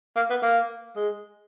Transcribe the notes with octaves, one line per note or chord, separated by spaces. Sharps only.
A#3
B3
A#3
G#3